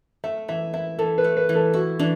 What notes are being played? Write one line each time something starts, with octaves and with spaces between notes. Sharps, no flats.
A3 E5
E3 E5
E4 E5
E3 A4
B4
A3
B4
E3
A4
E4 F#4
E3 D4